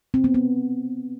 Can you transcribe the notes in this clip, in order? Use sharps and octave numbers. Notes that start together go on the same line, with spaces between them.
C4
B3
B3